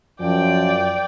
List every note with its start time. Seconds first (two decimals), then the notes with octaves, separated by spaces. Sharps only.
0.21 F#2 F3 D5 G5